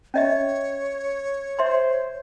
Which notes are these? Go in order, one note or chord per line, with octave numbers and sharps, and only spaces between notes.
C#4 C#5 D#5 E5
C5 E5 C6